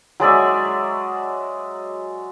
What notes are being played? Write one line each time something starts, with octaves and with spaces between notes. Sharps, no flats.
F#3 G#3 D5 E5